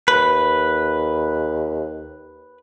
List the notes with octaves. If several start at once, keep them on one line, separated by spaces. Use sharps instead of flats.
D#2 B4